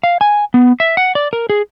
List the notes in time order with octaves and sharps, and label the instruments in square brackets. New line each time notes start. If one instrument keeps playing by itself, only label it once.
[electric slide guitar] F5
G#5
B3
E5
F#5
D5
A#4
G#4